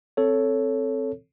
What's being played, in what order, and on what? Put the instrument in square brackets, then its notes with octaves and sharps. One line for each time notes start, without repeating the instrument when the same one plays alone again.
[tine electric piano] C4 A4 C#5